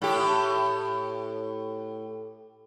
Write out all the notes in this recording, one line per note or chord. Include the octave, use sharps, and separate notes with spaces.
A2 G4